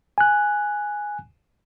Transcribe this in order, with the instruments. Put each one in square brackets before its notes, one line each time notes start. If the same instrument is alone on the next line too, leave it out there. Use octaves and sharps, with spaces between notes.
[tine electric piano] G#5 F#6